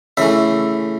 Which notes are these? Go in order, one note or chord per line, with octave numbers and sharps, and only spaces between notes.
C#3 E3 A3 E5